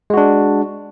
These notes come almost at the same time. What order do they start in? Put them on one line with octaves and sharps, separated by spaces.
G#3 F#4 D4